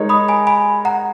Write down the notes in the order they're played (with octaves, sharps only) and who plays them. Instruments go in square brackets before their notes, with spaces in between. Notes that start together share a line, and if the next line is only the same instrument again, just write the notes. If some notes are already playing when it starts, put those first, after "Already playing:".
Already playing: [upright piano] G#3 D#4 A#4 C#5
[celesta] B5 D#6
G#5 B5
G#5 B5
F#5 A#5